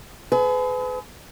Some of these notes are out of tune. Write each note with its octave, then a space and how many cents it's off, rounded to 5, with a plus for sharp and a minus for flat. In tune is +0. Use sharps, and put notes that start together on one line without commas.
G#4 +40 B4 +35